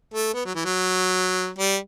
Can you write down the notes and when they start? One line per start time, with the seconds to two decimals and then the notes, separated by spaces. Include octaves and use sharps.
0.14 A3
0.34 B3
0.45 F#3
0.55 E3
0.65 F#3
1.58 G3